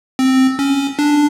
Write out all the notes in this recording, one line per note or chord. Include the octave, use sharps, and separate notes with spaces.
C4
C#4
D4